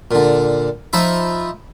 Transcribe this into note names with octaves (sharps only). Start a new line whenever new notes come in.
A#2 D3
F3 D#4 E5 B5